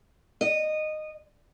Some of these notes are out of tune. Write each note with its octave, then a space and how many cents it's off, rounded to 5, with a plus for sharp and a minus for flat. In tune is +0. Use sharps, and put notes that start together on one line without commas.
D#5 -15